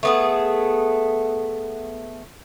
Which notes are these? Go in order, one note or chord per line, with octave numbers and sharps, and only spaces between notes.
A3 B3 G#4